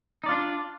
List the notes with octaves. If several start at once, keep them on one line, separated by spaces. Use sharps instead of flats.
D4 D#4 F4 D5